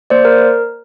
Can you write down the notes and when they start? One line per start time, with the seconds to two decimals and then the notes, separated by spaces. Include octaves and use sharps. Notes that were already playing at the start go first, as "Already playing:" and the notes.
0.10 A#3 C5 D5
0.25 A#4